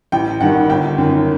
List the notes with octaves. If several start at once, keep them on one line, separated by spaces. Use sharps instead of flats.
A1 G5
G2 D#3 F#5
G1 G5
F#2 D#3